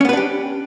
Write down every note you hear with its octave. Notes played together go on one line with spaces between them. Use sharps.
B3 C#4 D4 G4 B4